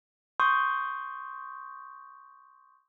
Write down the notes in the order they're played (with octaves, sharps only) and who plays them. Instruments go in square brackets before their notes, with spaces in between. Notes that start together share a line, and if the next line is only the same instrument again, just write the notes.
[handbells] C6 C#6 D#6 G6